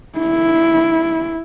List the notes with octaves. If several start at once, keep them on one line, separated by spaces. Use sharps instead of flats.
E4